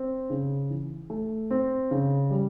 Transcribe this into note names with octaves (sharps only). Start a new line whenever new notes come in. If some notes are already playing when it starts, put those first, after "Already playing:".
Already playing: C4
C#3
E3
A3
C4
C#3
G3